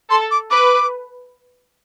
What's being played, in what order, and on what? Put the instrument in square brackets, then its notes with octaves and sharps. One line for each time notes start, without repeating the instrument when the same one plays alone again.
[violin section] A4 [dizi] C6
[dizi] D6
[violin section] B4 [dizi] D6